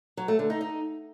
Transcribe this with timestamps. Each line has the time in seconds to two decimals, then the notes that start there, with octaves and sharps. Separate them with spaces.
0.17 F#3
0.28 A3
0.39 D3
0.50 D#4
0.61 D#4